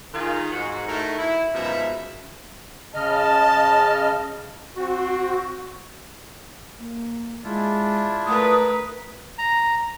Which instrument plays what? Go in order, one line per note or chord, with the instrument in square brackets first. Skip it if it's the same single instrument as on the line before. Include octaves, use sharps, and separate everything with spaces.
[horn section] D#3 F4 G#4
G#2 F#4
A3 D#4 E4 F#4 A4 A#4
E4
F#2 B2 F3 G#3 D#4 E5
[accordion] C#3 D#5 F6 [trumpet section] A5
[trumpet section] C4 [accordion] F#4
[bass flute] A#3
[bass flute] G#3 [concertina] D4 E4 F4
[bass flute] A3 [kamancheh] A#4 B4 [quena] D#6
[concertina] A#5